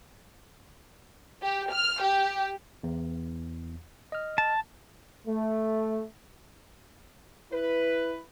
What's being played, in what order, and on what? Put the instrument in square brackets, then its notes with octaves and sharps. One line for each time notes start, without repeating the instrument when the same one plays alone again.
[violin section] G4
F6
G4
[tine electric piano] E2
D#5 F6
[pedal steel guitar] A5
[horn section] A3
[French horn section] E4 B4